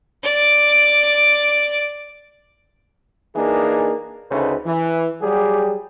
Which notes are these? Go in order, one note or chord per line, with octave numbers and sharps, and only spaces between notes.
D5 D6
E3 A#3 D4 D#4 G#4
D2 C#3 A3 D#4 B4 C5
E3
F#3 G3 G4 G#4